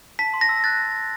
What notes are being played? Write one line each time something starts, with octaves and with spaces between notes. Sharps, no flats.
A5 B6
C6
A#6
E6
F#6 A6